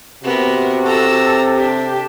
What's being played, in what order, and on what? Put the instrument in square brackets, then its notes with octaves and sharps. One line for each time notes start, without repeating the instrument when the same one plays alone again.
[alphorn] C3 [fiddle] B3 A#4 [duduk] F#4
[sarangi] A4 [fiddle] A#5 E6
[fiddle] D4 [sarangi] G4